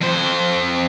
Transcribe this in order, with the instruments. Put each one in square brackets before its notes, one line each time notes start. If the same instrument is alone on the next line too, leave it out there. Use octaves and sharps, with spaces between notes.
[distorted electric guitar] F2 C5